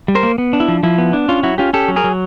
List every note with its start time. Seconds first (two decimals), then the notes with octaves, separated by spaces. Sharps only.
0.08 G3
0.15 A#4 C5
0.23 A#3
0.38 B3
0.53 D4
0.60 E4
0.68 F3
0.83 F3 E4
0.98 B3
1.13 D4
1.29 C#4 F4
1.43 F#3 E4 F#4
1.58 C#4 F4 G4
1.73 C#4 G4 A4
1.88 F#3
1.96 G#4 A#4
2.04 F#3